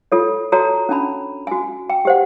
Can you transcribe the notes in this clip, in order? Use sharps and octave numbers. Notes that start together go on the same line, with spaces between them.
F4 A4 C#5
F#4 A4 C#5 A5 A#5
C#4 D4 A5 B5
F#4 G#5
G5
G4 C5 F#5